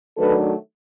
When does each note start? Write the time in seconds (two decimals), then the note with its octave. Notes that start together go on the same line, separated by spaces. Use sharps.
0.17 D#3 F#3 A3 D4 A4 B4